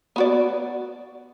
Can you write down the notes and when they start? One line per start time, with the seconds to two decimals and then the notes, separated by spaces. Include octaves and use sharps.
0.16 B3 F#4 D5